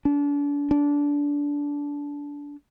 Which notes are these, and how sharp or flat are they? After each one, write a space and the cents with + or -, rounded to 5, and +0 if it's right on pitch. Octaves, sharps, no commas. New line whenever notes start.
D4 -35
D4 -20